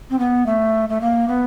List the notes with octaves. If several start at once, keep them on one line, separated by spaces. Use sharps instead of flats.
C4
B3
A3
A3
A#3
B3